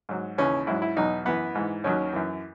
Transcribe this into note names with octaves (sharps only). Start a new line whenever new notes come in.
G#2 F#3
D#2 C#3 E3 C#4
G#2 F#3 E4
E4
E2 B2 F#3 D#4
F#2 E3 B3
G#2 E3
D#2 D#3 F#3 C#4
F#2 E3